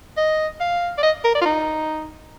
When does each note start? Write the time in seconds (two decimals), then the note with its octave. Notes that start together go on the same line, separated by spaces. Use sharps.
0.17 D#5
0.60 F5
0.98 D5
1.03 D#5
1.24 A#4
1.35 D5
1.41 F4
1.46 D#4